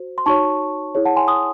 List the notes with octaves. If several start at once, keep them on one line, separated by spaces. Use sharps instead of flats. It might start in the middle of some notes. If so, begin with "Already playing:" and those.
Already playing: F#4 C5
C6
D#4 F#4 C#5 A5 C#6
E4 G#4 C#5
F#5 A5
G#5 C6
C6 D#6